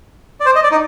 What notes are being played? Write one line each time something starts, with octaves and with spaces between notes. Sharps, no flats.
D5
C5
D#5
D5
D#4